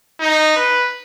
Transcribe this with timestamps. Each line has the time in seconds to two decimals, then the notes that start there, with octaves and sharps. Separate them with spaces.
0.20 D#4
0.56 B4